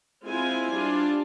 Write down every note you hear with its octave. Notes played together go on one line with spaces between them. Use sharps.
G#3 C4 E4 F4 C5 G#5
G3 D4 F4